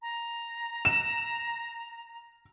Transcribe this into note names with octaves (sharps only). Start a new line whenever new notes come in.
A#5
E7